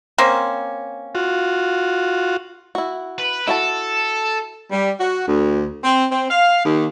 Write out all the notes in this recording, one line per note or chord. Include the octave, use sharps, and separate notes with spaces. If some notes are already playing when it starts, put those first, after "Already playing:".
A#3 C4 C#4
F4 F#4
E4 F#4
B4
E4 F#4 A4 A5
G3
F#4
D2
C4
C4
F5
D#2